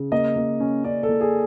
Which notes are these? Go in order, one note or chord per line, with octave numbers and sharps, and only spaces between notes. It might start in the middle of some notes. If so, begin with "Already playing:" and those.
Already playing: C#3
A#3 D#5
A#3
C#4
C#4 D5
A4
A#3
G#4